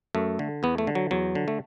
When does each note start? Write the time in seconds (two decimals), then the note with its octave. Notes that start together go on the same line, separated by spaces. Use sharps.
0.15 F#2 A3
0.39 D3
0.63 E2 B3
0.78 A3
0.87 D3
0.95 F#3
1.11 E2 F#3
1.35 D3
1.48 A3